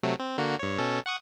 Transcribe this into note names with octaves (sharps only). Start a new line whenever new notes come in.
C3 F#3 A3
C4
D3 A#3 F#4
G2 C#5
B2 C#4 A4
F#5 C#6 D#6